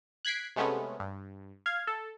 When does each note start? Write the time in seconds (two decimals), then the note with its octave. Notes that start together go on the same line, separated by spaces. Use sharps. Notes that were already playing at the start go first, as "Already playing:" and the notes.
0.25 F#6 G#6 B6 C7 D7
0.56 C3 G#3 A3 B3 C#4
1.00 G2
1.66 F5 G#6
1.87 A4